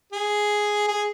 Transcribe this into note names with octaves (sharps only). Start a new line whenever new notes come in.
G#4
G#4